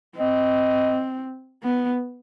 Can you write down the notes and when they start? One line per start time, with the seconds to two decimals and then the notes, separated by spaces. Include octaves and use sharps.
0.17 C4 D#5
1.63 B3